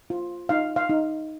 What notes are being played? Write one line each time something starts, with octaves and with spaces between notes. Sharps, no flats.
F4
D#4 F5
F5
D#4